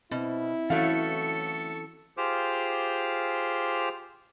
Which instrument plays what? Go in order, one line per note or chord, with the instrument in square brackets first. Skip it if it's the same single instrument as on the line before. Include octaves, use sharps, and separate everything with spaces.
[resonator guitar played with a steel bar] B2 [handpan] C4 [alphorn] E4
[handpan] E3 C#4 [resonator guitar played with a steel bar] F#3 A3 F5 [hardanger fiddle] A4 C#6
[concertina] F4 G4 G#4 C5 D6 F6